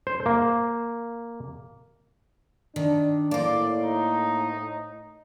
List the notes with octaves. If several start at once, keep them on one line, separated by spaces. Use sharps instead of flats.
C5
A#3
D#3 D4
A2 A#3 C5 D5
D#4